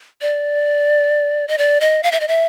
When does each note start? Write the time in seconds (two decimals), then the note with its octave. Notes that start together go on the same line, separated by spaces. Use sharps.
0.21 D5
1.48 D#5
1.58 D5
1.81 D#5
2.03 F5
2.12 E5
2.20 D#5
2.28 E5